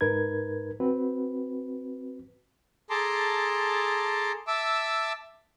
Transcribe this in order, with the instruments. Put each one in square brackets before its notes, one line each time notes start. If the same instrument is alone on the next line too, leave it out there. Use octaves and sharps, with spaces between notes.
[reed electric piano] G#2 D#4 A#4 B4 G#6
C4 F#4 B4
[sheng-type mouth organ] G#4 A4 A5 A#5 C6 D6
E5 A5 D6 E6